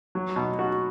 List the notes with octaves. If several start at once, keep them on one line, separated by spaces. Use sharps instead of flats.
F#3
B2
F#4